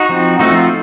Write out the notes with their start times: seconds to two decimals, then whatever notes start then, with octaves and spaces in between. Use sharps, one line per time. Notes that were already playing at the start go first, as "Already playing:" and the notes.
Already playing: D#4 F#4
0.09 F3 C4
0.39 F3 A3 C4 D#4 F#4
0.55 F4